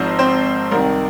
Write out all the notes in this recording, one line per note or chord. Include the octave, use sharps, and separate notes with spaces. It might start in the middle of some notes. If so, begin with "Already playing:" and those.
Already playing: G#1 G#2 F3 C4 D#4 C5 D#5
C4 C5
C2 C3 D#3 A#4